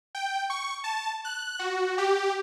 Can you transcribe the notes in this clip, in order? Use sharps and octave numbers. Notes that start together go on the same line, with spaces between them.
G5
C#6
A5
F#6
F#4
G4